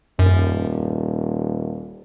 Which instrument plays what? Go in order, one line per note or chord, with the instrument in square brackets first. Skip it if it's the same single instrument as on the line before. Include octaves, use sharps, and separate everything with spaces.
[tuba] D#1 [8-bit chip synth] F#2